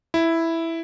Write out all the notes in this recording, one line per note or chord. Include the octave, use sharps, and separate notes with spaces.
E4